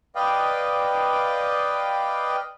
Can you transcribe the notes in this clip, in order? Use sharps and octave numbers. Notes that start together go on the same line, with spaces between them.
B4 D5 D#5 F5 G5